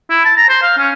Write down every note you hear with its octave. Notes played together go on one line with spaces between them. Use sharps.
E4
A5
A#5
C5
F5
C#4